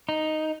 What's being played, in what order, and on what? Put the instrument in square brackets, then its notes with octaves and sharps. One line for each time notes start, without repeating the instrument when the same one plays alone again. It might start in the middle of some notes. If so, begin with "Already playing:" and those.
[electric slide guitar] D#4